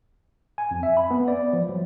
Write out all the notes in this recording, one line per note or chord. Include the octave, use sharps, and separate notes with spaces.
G#5
F2
E5
B5
B3
D5
F3
F#3